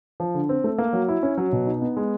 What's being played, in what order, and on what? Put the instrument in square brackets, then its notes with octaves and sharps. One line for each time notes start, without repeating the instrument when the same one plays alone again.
[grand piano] F3
D3
C4
A3
A#3
F#3
E4
C#4
F#3
B2
D#4
B3
G#3